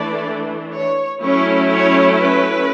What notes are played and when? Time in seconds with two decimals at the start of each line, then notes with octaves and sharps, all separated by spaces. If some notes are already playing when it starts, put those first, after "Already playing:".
Already playing: E3 A3 D4 D5
0.75 C#5
1.24 F#3 A3 C#4 E4 C#5
1.72 C#5
2.20 B4